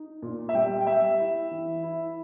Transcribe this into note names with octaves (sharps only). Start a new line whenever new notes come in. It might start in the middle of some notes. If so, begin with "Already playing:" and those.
Already playing: D#4
A#2
E5
G3 G5
G5
G3 E5
E4
E3
E4